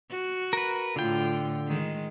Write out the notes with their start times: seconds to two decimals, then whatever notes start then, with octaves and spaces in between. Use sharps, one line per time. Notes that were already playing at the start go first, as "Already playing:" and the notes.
0.11 F#4
0.53 A#4 B4
0.96 A2 D3 F4 G5
1.67 D#3 G#3